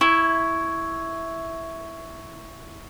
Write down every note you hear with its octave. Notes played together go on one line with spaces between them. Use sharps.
E4 C#6 G#6